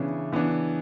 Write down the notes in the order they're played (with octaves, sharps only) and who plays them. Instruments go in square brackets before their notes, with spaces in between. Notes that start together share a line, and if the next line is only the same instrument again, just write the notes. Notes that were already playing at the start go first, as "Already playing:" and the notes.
Already playing: [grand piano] C#3 E3 B3 D4
E3 B3 D4